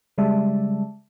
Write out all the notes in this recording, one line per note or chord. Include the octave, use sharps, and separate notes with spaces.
C#3 G3 G#3 D5 E5 A5